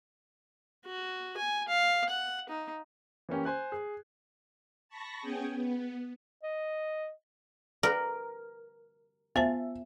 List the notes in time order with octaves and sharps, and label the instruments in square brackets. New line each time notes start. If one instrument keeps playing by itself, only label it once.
[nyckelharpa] F#4
G#5
F5
F#5
D#4
[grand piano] E3 A#3 C#4 G4
C5 G#5 F#6
G#4
[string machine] A5 B5 C#6 A#6
B3 C#4 G#4 G5 G#5
B3
[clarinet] D#5
[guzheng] A#4 [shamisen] B4 D5
[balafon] B3 C5 A5 [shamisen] F4 [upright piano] E5